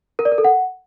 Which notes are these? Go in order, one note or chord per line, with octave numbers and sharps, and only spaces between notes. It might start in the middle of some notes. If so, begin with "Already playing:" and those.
A#4
D5
A#4
A4
F#5